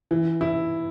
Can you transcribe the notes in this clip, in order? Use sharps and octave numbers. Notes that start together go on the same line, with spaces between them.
E3
E4